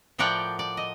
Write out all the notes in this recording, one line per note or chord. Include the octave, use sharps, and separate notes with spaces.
A2 F3 A#4 D5 F#5 G5
D5
D#5